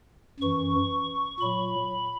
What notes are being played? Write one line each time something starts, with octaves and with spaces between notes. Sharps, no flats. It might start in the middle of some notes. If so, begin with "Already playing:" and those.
F#2 E3 C#6
A#2 F#3 B5